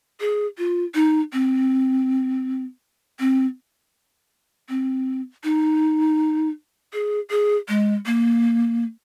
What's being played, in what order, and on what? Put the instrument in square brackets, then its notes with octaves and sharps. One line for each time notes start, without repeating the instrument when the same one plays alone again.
[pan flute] G#4
F4
D#4
C4
C4
C4
D#4
G#4
G#4
G#3
A#3